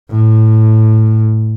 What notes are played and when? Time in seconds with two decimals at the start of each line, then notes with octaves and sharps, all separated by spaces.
0.11 A2